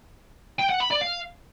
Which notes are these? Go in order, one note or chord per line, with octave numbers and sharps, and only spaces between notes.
G5
F#5
B5
D5
F5